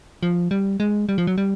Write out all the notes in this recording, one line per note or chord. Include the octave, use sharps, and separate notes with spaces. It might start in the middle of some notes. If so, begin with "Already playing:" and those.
F3
G3
G#3
G3
F3
F#3
G3